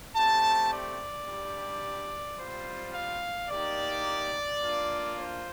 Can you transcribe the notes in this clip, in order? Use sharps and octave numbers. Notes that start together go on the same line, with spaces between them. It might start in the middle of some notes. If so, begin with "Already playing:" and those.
A3 C4 G4 A5
D5
G3 D4 G4
G3 C4 F4 C5
F5
A#3 D#4 G4 D5
A#3 D4 F4
C5